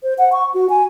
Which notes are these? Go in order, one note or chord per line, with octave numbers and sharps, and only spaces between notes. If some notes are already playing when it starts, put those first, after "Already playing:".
C5
F#5
C#6
F#4
G#5